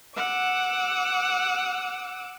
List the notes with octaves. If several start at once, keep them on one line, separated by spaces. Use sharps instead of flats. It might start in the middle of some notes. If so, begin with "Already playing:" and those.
F#5 D6 E6